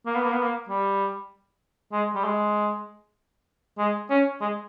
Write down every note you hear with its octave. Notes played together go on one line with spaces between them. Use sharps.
A#3
B3
A#3
B3
A#3
G3
G#3
G3
G#3
G#3
C#4
G#3